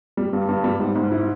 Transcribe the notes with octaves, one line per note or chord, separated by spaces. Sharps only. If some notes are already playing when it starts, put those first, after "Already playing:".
G3
G2
G2
G3
G#2
G#2
E4